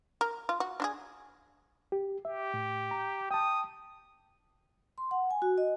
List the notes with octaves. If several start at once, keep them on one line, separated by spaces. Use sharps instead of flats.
A#4
F4
F#4
D4 F#4 G#4
G4
G4 E5
A2
A#5
G5 A5 D#6
C6
F#5
G#5
F#4
D#5